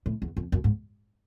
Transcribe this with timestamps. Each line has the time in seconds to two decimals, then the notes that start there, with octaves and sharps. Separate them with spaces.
0.06 A2
0.22 E2
0.37 F2
0.52 F#2
0.64 G#2